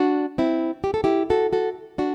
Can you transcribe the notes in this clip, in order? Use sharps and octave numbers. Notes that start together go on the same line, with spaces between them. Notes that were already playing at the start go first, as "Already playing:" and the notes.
Already playing: D4 F#4
C4 E4
G4
A4
E4 G4
F#4 A4
F#4 A4
D4 F#4